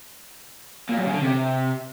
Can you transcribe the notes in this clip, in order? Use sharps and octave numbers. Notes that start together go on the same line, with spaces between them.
A#2
F#2
C#3
D3
C3